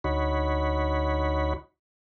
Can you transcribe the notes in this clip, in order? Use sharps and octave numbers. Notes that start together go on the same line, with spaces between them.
D2 D#4 F#4 C#5 B5